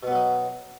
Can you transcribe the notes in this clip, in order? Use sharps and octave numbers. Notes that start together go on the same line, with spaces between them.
B2 F#3 B3 D#4